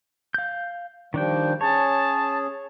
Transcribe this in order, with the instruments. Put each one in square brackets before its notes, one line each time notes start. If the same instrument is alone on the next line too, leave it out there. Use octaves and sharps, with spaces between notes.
[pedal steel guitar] F5 G6
[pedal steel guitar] D#3 D4 G5 [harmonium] F3 G3
[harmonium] C#4 G#4 [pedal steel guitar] C#5 [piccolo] A5